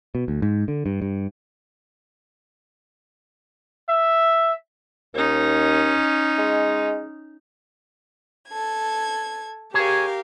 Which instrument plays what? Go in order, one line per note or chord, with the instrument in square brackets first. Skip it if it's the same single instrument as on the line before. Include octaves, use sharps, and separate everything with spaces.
[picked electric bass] B2
D2
G#2
D3
G2
G2
[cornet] E5
[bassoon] D#2 [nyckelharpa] C#4 D#4
[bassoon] G#3
[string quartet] A4 G#6
[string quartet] G4 A#4 F5 [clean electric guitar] G#4 C#5